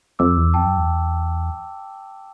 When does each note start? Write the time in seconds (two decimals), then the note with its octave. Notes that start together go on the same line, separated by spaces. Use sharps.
0.19 F2 D6 E6
0.37 E2
0.54 F2 G5 A5
0.66 F#2
0.78 E2